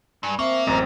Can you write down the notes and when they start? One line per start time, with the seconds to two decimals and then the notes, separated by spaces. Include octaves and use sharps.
0.23 G2 G#5
0.39 A#3 C4 E5 C#6
0.67 A1 F#2 C4 D#5 A#5